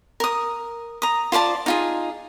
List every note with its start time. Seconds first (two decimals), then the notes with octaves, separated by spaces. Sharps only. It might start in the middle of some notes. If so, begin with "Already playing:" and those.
0.20 A#4 D#6
1.02 A#5 D#6
1.32 F4 C5 D5 A5
1.66 D#4 F4 G#4